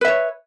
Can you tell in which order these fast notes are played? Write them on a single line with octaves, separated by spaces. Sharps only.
B4 E5 C#5